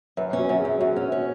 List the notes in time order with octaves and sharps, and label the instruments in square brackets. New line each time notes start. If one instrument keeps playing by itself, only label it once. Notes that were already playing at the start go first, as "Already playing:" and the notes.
[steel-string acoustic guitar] F#2 [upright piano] B4
[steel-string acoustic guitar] C#4
[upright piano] F#4
[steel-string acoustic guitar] F#2
[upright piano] G#4
[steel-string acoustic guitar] F#2
[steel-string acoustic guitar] F#2 [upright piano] F#4
[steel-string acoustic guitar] C#4
C#4